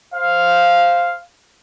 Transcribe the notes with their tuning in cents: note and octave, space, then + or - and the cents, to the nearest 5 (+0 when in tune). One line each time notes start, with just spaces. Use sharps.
C5 +0 F5 +0